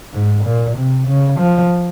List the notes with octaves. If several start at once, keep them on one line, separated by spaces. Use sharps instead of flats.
G#2
A#2
C3
C#3
F3